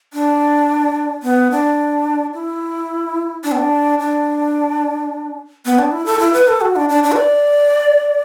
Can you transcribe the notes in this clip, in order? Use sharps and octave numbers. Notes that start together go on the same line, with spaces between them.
D4
B3
D4
E4
D4
B3
D4
D4
B3
D4
E4
A4
E4
B4
A4
F#4
D4
D4
D4
B4
D5